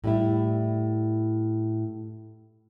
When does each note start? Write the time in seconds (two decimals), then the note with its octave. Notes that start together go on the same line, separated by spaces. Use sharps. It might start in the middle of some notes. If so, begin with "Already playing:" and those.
0.04 A2 G3 E4